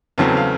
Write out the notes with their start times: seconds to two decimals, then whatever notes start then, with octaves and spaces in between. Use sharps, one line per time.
0.18 E2 C#3 F#3 A3 C4 A5
0.28 A5
0.37 F5